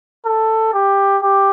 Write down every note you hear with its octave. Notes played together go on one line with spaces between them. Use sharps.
A4
G4
G4